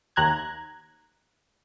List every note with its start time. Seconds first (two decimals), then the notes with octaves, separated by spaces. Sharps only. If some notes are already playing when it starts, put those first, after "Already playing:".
0.16 D#2 A#5 F#6 G#6